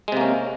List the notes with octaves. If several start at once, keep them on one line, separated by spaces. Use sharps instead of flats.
C3 G#3 A#3 C#4